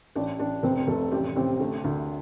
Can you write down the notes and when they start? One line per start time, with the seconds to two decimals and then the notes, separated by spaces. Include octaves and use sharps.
0.15 A1 D4 D5
0.39 A1 D4 D5
0.63 F1 C4 C5
0.87 F1 A3 A4
1.11 A1 G3 G4
1.36 A1 C3 C4
1.60 D3 A3
1.84 D2